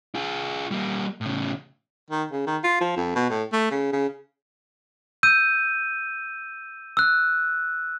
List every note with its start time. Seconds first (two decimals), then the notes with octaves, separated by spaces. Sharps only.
0.15 F4 G#4
0.71 G3 A#3
1.21 A2 C#3
2.10 D#3
2.31 C#3
2.47 D#3
2.64 F4
2.81 F3
2.97 F2
3.15 B2
3.30 A2
3.52 A3
3.71 C#3
3.92 C#3
5.23 E6 G6 D#7
6.97 E6 F#6